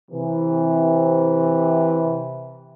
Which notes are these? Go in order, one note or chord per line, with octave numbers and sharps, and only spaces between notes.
C3 E3